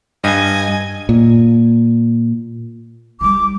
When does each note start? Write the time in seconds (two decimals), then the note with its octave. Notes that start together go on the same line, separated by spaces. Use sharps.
0.24 G2 D#5 G#5
1.09 A#2
3.21 D#3 G3 D6